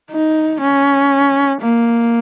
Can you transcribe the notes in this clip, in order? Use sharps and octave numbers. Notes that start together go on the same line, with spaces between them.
D#4
C#4
A#3